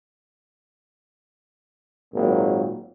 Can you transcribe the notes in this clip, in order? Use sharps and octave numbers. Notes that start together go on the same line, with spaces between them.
G#1 A#2 F#3 A#3